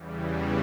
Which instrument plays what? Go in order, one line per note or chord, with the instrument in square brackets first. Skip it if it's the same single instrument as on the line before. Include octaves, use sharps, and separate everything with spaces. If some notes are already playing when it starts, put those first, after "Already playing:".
Already playing: [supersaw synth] E2 C#3 E3 G3